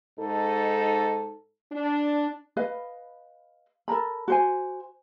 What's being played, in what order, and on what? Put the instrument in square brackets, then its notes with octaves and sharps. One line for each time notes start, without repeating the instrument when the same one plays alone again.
[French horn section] G#2 D#4 A4
D4
[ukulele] B4 D#5 F5
A4 A#4 A#5 B5
F#4 C5 G#5